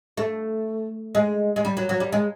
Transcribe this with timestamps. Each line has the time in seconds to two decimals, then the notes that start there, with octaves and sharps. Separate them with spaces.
0.17 A3
1.15 G#3
1.56 G#3
1.65 G3
1.77 F#3
1.89 F#3
2.00 G3
2.12 G#3